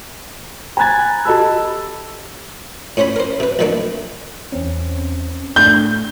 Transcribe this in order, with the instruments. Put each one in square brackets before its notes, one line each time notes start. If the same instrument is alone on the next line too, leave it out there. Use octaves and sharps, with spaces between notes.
[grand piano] G#5 A#5 B5 F#6 G#6 A6
G4 A4 D#5 A5 B5 E6
[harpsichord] A2 C#4 C5 C#5 B5
A#4 C5
C3 B4
A#1 D3 D#3 A3 D4
[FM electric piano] E2 C4 C#4
[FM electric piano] A2 A3 D4 [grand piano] G6